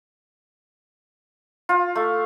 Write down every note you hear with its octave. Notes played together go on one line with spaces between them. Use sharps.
F4
A3